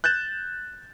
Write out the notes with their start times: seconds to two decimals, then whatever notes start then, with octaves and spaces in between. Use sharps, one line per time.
0.04 F#6 G6 A6 E7